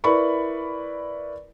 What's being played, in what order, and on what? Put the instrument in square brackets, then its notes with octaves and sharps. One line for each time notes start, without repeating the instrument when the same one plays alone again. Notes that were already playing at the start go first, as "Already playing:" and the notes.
[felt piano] E4 A#4 B4 D5 B5 C#6